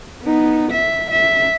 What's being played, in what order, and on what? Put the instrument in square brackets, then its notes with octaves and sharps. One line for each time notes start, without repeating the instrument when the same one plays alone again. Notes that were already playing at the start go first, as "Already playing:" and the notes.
[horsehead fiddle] B3 D#4
E5
E5